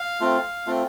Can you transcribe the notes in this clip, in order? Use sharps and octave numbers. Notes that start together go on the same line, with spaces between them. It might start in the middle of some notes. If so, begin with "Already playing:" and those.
Already playing: F5
A3 C4 F4
A3 C4 F4